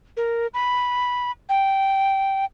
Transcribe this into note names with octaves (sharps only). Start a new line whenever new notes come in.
A#4
B5
G5